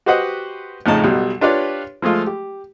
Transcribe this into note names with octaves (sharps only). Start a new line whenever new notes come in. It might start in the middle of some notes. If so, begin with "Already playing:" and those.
F#4 G4 B4 C5 D#5 F#5
F2 A2 C#3 D#4 A5
B1 B2 G3
D4 F4 G4 B4 C#5 D5
F3 G#3 A3 F4
G4